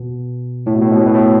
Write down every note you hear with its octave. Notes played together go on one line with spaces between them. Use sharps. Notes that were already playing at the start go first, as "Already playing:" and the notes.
Already playing: B2
A2
B2
A2
B2
A2
B2
A2